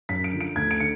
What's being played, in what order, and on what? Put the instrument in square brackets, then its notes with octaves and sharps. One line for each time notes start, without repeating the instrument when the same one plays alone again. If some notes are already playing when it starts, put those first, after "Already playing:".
[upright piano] F#2 B6
D7
D3 F3
D7
D2 G#6
D7
D3 C#7